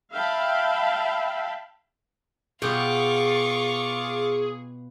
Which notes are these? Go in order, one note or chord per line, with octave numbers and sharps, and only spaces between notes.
E5 F5 G5 A5 B5
B2 F4 G4 G#4 C#6 D6